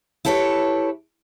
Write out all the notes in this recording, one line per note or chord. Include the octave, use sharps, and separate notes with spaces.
E4 G4 A4 B4 C#5